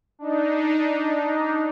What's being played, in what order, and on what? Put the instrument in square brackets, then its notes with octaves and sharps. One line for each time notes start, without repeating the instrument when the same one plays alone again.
[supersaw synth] D4 D#4